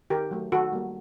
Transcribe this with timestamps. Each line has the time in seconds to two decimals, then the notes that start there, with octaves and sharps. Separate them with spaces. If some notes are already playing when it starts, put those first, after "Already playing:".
0.10 D#3 G4 A#4
0.31 F#3 A3
0.52 D#3 F#4 A4
0.73 G3 A#3